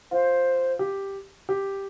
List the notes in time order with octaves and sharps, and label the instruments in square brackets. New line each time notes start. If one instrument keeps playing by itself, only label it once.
[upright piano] F4 [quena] C5
[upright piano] G4
G4